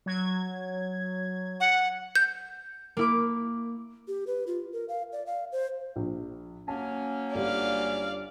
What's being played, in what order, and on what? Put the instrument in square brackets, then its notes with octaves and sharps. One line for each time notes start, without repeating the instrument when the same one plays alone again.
[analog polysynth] F#3 G#6
[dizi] F#5
[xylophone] G6
[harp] A#3 E4 D6
[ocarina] G4
B4
F4
A#4
F5
D5
F5
C5
[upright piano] A#1
[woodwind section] F#3 A#3 C#4 [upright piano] A5
[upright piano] G1 G2 G3 [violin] D5 F5